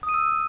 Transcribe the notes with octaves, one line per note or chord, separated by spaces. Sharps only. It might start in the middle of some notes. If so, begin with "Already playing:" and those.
D#6
D#7
E6